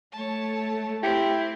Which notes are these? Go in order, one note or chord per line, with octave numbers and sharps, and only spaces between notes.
A3 C#5 A5
C4 E4 G4